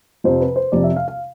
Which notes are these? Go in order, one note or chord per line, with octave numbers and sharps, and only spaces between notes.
F2 C3 F3 C5
B4
C5
F2 C3 F3 D5
E5
F5
F5